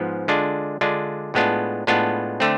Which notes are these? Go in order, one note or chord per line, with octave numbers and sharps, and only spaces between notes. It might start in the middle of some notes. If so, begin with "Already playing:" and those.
Already playing: G#2 F3 B3
D3 G#3 D4 F4
D3 G#3 D4 F4
A2 G#3 B3 D4 F4
A2 G#3 B3 D4 F4
D3 A3 C4